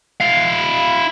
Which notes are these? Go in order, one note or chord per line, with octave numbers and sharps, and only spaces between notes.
E4 F5